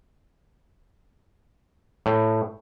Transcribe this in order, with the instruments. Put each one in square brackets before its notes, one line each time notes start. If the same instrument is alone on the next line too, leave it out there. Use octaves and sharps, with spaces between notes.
[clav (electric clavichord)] A2